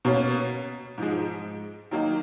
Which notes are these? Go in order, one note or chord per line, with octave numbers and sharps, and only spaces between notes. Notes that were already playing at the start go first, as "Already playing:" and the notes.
B2 A#3 C#4
G#2 F3 G#3
D#3 F#3 A#3 D#4